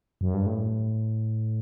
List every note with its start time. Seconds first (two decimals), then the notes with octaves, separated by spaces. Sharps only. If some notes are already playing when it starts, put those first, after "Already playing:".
0.21 F#2
0.34 G2
0.46 A2